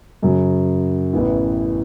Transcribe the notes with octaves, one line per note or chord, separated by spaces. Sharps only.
F#2 C#3 F#3
A1 A2 E3 B3 E4